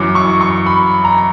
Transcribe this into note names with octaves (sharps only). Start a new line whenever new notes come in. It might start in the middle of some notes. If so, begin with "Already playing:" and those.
Already playing: F#2 E3 D6
C#6
C#6
B5
A#5